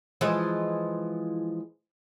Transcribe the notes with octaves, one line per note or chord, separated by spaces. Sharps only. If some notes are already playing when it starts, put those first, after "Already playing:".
E3 F3 G#3